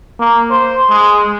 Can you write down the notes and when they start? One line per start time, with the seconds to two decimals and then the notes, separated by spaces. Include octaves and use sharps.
0.20 A#3
0.51 C5
0.90 G#3